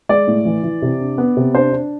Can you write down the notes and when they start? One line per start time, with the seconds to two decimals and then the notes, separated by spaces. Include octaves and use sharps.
0.09 G#3 D5
0.27 A2
0.45 E3
0.63 E3
0.82 C3
1.01 D4
1.18 B3
1.37 C3
1.55 D4 C5
1.72 D4